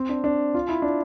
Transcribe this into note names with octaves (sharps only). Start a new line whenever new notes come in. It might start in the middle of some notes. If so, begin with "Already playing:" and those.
Already playing: C4
D4
D4
F4
E4
D4